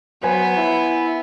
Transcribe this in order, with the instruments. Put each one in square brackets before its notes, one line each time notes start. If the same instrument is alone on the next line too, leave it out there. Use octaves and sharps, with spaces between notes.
[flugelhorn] F#3 [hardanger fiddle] B3 [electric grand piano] B4 C5 G#5
[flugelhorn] E4